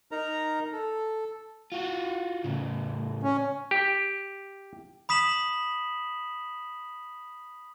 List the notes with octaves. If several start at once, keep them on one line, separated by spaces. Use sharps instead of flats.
D#4 A#4 A#5
A4
F4 F#4
A2 C#3
C#4
G4
B5 D#6 B6 E7 F#7